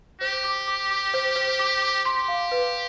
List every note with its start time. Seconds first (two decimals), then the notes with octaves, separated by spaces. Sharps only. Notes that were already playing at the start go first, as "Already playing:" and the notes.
0.21 G4 C5
0.44 D6
0.68 D6
0.91 D6
1.14 C5
1.36 C5
1.59 D6
1.82 D6
2.05 G4 C6
2.28 F5
2.52 B4